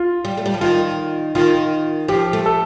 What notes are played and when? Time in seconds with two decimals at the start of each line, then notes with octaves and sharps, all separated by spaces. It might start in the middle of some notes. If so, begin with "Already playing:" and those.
Already playing: F4
0.25 G3
0.37 A3
0.46 G3
0.54 F3
0.61 D#3 F4
1.35 D#3 F4
2.08 F3 G4
2.33 A3
2.46 A4